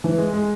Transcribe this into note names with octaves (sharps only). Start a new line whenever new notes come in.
E3
G#3
G#3